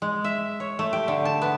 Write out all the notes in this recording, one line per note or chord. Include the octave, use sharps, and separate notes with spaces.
G#3
E5
C#5
A3
G4
D3
A5
B3